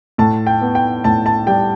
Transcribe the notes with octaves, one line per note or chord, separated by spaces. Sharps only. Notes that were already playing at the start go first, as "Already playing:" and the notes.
A2 A5
G5
B3
G5
A2 A5
A5
G3 G5